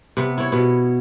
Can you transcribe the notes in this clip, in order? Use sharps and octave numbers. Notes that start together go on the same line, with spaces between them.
C3 B3
E4 C#5
B2 B3